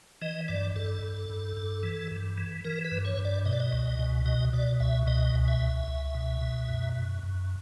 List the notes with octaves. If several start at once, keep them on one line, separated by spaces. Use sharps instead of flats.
E3 D#5
G2 D5
G2 A4
G2
G2
G2
E3
G2
E3
E3 A#4
B4
G2
C#5
G2
D5
B2 D#5
D5
D#5
C#2
B2
B2 D#5
B2 D5
C#2 E5
B2 D#5
C#2
E5
C#2
C#2
B2
B2
F#2
F#2
F#2